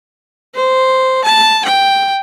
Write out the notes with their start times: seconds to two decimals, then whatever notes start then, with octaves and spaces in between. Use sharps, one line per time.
0.55 C5
1.25 A5
1.66 G5